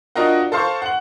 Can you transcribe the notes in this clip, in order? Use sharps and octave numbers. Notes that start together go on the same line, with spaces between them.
D4 F4 F#4 A#4 D#5 F#5
A4 C5 F5 C6 C#6
F#5 F#7